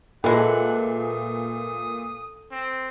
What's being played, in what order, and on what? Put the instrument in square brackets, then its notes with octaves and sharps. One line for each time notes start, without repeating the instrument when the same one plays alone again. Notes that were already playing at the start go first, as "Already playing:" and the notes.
[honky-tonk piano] A#2 [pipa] E3 G#3 [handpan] A4 [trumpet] F#5
[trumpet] D#6
C4